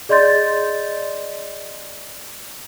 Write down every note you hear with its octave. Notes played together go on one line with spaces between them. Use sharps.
G#4 D5 D#5 C6 G6 A6